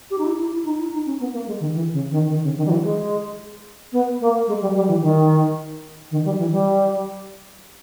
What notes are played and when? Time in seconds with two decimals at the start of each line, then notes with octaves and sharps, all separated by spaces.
0.10 G4
0.18 D#4
0.24 E4
0.38 E4
0.52 E4
0.65 D#4
0.78 E4
0.93 D#4
1.06 C#4
1.20 B3
1.33 A#3
1.47 G#3
1.60 D#3
1.74 E3
1.92 C#3
2.11 D#3
2.29 D#3
2.43 C#3
2.56 D#3
2.66 G3
2.70 E3
2.84 G#3
3.92 B3
4.20 A#3
4.47 G#3
4.61 G3
4.75 G3
4.88 E3
5.02 D#3
6.11 D#3
6.25 G3
6.38 E3
6.52 G3